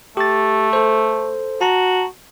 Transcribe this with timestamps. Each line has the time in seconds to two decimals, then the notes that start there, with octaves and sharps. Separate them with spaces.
0.17 A3 G4 A6
0.73 A4 C5
1.61 F#4 A5 A#5